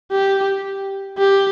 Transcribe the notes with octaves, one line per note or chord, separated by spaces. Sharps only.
G4
G4